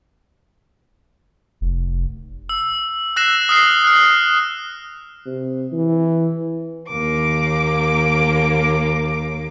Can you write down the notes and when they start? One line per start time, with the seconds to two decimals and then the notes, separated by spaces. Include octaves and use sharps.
1.61 F1
2.49 E6
3.16 E6 F#6 A#6 C7 E7
3.49 D#6 F6 C7
3.84 F6 F#6
5.26 C3
5.72 E3
6.88 D#2 A#3 D6